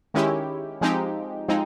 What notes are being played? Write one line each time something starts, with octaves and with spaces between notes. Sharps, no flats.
D#3 G#3 C#4 E4 G4
F3 G#3 C4 D#4 G4
F3 G#3 C4 D#4